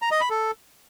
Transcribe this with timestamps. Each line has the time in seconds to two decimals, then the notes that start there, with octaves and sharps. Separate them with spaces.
0.02 A#5
0.11 D#5
0.21 B5
0.30 A4